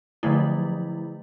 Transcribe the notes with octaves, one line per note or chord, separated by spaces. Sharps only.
D3 F3 F#3 A3 E4